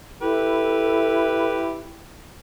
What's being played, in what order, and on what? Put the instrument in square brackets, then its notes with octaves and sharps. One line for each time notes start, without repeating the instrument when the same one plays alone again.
[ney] E4 [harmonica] G4 B4 [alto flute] A4